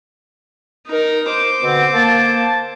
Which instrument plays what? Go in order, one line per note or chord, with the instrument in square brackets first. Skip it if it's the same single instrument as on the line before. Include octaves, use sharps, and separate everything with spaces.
[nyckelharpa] D#4 A#4
C5 D6
[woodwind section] B2 D3 C4
A#3 A5